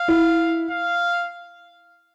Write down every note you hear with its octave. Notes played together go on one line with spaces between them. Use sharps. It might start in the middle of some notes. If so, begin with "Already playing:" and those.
Already playing: F5
E4
F5